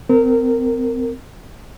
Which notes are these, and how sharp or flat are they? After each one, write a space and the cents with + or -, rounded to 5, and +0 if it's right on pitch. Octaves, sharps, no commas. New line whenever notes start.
C4 -30 A#4 -20